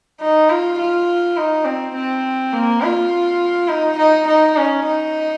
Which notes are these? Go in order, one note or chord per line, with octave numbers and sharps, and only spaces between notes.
D#4
F4
F4
D#4
C4
C4
A#3
F4
D#4
D#4
D#4
C#4
D#4